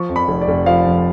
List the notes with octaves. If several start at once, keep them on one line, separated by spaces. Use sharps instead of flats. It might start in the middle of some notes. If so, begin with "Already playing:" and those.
Already playing: F3 C#6
F2
B5
F1
D5
F1
F3 F5
F2